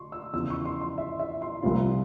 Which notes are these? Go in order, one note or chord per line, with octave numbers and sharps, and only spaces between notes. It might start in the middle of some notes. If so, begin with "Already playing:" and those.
Already playing: C6 C#6
E6
E2 C#3 F3 E6
C#6
C6
C6
E5
E5
C6
C2 C3 F3 C4 F4